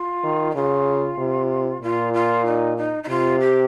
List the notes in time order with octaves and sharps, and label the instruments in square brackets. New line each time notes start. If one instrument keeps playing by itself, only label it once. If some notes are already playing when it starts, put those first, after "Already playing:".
Already playing: [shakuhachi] F4
[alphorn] D#3
[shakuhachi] D#4
[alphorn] C#3 [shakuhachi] F4
[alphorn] C3
[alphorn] A#2 [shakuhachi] F4
[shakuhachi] F4
D#4
D#4
D#4
[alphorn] C3 [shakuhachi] F4
[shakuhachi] G4